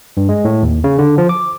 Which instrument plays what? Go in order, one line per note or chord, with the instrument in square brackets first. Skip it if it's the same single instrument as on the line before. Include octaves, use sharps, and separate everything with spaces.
[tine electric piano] G2
G#3
A2
D#2
C#3
D3
F3
D6